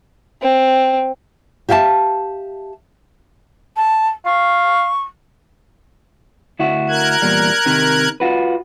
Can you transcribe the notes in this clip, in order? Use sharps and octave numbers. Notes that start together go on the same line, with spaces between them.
C4
G4 E5 F5 G5 A5
A5
F5 C#6
D2 E4 F#4
A#4 F#6 G#6
E2 A#2 G3
C3 D#3
F4 F#4 B4